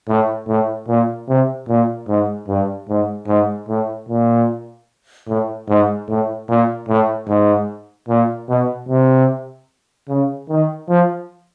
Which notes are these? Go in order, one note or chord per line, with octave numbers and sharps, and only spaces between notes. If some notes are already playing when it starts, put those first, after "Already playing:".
A2
A2
A#2
C3
A#2
G#2
G2
G#2
G#2
A2
A#2
A2
G#2
A2
A#2
A2
G#2
A#2
B2
C3
C#3
D#3
F3